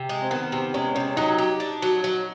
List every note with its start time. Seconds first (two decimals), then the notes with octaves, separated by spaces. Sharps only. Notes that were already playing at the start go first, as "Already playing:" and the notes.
Already playing: C3
0.09 G#3
0.22 C4
0.30 D#3 B3
0.52 C3 C4
0.74 G#3 C#4
0.95 C3 C#4
1.17 F#3 D#4
1.38 G4
1.60 D4
1.82 F#3
2.04 F#3